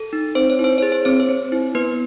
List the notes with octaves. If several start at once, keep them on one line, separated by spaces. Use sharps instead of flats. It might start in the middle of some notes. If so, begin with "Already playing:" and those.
Already playing: A4
D#4
C4 C5
C#5
E4 C5
G#4 C#5
C5
C4 C#5
C5
C4
E4
B3 B4